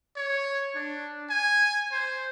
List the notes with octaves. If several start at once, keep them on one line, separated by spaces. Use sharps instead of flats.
C#5
D4
G#5
C5